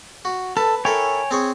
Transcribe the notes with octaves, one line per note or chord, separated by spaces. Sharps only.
F#4
A4 B4 A5
E4 A4 A#4 C#5 G5 G#5
C4 G#4 C#5